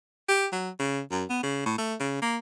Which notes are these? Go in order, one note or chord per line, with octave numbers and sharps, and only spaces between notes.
G4
F#3
C#3
F#2
B3
C#3
A2
A3
C#3
A#3